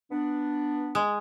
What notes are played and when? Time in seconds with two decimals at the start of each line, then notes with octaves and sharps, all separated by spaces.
0.11 B3 D4
0.95 G#3